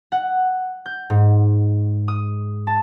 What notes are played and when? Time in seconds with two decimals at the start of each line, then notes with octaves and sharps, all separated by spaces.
0.12 F#5
0.86 G6
1.10 G#2
2.08 D#6
2.67 A5